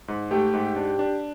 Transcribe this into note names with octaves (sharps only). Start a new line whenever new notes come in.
G#2
A3 G4
G#2
D4
D4